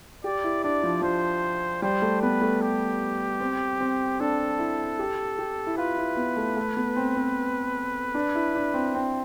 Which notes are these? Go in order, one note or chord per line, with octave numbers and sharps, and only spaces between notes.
G4 D5
E4
D4 D5
F3
F3 C5
G3 C5
A3
B3 B4
A3
G4
C4
C4
D4 A4
E4
G4
G4
E4
F4 B4
E4
B3
A3
A3
B3
C4
C4
D4
E4
D4
C4
C4